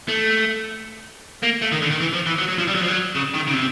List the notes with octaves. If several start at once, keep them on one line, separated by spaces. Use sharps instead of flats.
A3
A#3
A3
D#3
D3
D#3
E3
F3
E3
F#3
F#3
F3
G3
F#3
F3
F#3
C#3
D#3
C#3
C3